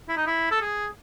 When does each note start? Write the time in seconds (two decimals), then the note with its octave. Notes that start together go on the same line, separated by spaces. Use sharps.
0.09 E4
0.17 D#4
0.26 E4
0.51 A4
0.61 G#4